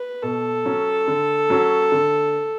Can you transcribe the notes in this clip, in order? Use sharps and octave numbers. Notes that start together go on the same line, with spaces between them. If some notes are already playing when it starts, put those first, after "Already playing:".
Already playing: B4
B2 A4
F#3 C#4
D3
F#3 C#4 F#4
D3